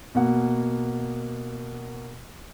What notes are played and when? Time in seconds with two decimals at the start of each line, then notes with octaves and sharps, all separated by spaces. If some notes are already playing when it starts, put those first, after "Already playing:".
0.15 B2 A#3 F#5